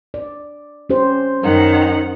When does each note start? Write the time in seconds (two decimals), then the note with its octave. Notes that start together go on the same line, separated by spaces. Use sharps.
0.14 D5
0.90 C#4 G4 C5
1.43 F#2 D#3 F#5